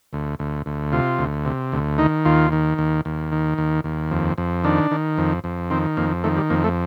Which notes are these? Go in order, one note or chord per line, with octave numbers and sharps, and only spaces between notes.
D2
D2
D2
C3 F4
D2
C3
D2
D#3 D#4
D#2 F4
D#3
D#2
D#2
D#3
D#2
D#2
F2
F2
D#3 D4
D#3
F2
F2
D#3 C4
F2 A#3
D#3 A3
G3
F2 A#3
A3